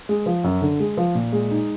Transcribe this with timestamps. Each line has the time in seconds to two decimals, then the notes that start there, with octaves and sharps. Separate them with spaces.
0.09 G#3
0.26 F3
0.44 F#2
0.62 D3
0.80 G#3
0.97 F3
1.15 A#2
1.33 G#3
1.51 D#4